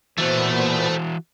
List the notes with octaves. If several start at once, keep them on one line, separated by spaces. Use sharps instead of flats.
A#2 E3 A3 B3 F#4 C5